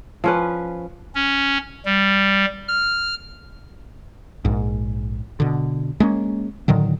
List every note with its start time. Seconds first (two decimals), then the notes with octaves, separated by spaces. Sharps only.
0.24 F3 C#4 B4
1.15 C#4
1.85 G3
2.68 F6
4.45 A#1 G#2
5.40 B2 D3
6.00 G#3 A#3 C#4
6.68 A2 D3 D#3 F#3